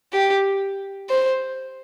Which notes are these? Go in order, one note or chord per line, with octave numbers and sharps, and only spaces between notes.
G4
C5